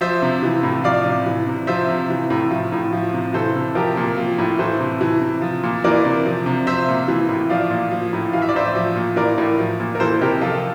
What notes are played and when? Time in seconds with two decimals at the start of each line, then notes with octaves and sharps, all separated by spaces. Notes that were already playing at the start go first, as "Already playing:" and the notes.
0.01 F3 C5 E5
0.22 C3
0.43 E3
0.63 A2
0.84 F3 D5 F5
1.05 C3
1.26 E3
1.47 C3
1.67 F3 C5 E5
1.89 C3
2.10 E3
2.30 A2
2.51 F3
2.72 A2
2.93 F3
3.13 C3
3.34 E3 A4 C5
3.56 C3
3.75 F3 G4 A#4
3.97 A#2
4.17 F3
4.39 A2
4.59 E3 A4 C5
4.80 C3
5.01 E3
5.21 C3
5.42 F3
5.63 A#2
5.84 E3 A#4 D5
6.05 C3
6.26 F3
6.46 C3
6.67 F3 C5 E5
6.89 A#2
7.08 E3
7.29 A2
7.50 F3 D5 F5
7.71 A#2
7.91 F3
8.13 A2
8.33 E3 F5
8.42 E5
8.49 D5
8.55 A2 C5 E5
8.75 F3
8.96 A#2
9.16 E3 A#4 D5
9.38 A2
9.59 F3
9.80 A#2
9.95 A#4
10.00 E3 A4 C5
10.21 C3 G4 A#4
10.41 F3 F4 A4